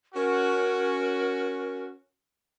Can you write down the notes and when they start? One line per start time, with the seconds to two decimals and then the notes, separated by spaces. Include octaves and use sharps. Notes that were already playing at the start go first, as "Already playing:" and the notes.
0.14 C#4 F#4 A#4